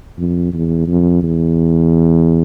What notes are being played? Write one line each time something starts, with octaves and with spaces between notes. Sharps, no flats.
F2
E2
F2
E2